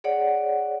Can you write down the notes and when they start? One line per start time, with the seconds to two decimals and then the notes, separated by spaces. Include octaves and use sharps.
0.04 G#4 C#5 D5 F#5